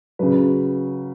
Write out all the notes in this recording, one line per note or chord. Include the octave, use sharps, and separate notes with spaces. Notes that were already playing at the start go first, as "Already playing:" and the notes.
C#3 F#3 B4